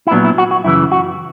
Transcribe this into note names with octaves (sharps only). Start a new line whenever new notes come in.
E4
A#2 F#3 B3 D4
E4
F#4
F#4
F#2 C#3 E3 E4
F#4